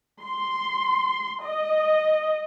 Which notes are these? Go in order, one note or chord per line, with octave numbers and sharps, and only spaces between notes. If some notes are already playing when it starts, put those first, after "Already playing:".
C6
D#5